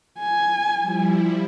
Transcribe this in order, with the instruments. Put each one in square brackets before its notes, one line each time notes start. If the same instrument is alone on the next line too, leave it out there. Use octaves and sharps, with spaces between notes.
[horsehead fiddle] G#5
[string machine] F3 G3 E4